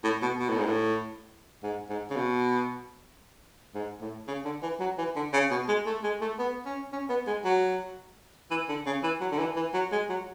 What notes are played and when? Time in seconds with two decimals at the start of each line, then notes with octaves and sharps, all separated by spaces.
0.04 A2
0.22 B2
0.40 B2
0.49 A2
0.58 G#2
0.66 A2
1.63 G#2
1.89 G#2
2.10 C#3
2.16 B2
3.74 G#2
4.01 A2
4.28 C#3
4.45 D3
4.62 E3
4.80 F#3
4.98 E3
5.16 D3
5.33 C#3
5.51 B2
5.68 G#3
5.86 A3
6.04 G#3
6.21 A3
6.39 B3
6.65 C#4
6.92 C#4
7.09 B3
7.27 G#3
7.45 F#3
8.51 E3
8.69 D3
8.86 C#3
9.03 E3
9.21 F#3
9.31 D3
9.39 E3
9.56 E3
9.74 F#3
9.92 G#3
10.09 F#3